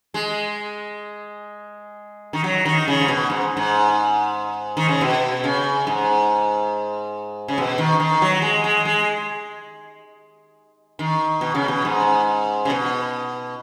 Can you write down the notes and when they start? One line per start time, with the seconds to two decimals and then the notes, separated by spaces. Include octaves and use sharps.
0.14 G#3
2.33 D#3
2.44 F#3
2.65 D#3
2.88 C#3
3.00 G#2
3.08 B2
3.30 G#2
3.57 G#2
4.77 D#3
4.89 C#3
5.01 B2
5.44 C#3
5.87 G#2
7.48 C#3
7.58 B2
7.78 D#3
8.00 D#3
8.22 F#3
8.42 G#3
8.64 G#3
8.85 G#3
10.99 D#3
11.41 B2
11.55 C#3
11.68 B2
11.85 G#2
12.65 C#3
12.70 B2